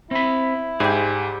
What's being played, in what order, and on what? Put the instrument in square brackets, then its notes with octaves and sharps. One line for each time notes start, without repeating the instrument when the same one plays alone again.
[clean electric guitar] C4 B5 [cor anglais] E4
[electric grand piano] G#2 [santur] G3 G5 [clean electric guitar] G#4